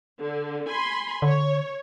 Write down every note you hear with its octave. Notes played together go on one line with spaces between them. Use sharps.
D3
G#5 B5 C6
D3 C#5